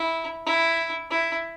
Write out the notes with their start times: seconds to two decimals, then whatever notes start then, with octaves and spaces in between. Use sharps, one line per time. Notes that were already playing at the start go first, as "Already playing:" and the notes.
Already playing: E4
0.46 E4
1.11 E4